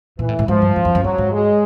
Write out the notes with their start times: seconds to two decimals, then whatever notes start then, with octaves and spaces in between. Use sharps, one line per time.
0.19 A#2 E3
0.29 A2
0.39 A2
0.48 G#2 F3
0.62 G2
0.76 F#2
0.85 F2
0.95 F#2
1.04 G2 F#3
1.18 G#2
1.32 G#3